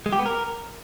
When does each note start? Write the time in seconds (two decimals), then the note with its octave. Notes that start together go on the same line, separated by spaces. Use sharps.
0.06 G#3
0.13 G4
0.19 B3
0.26 A#4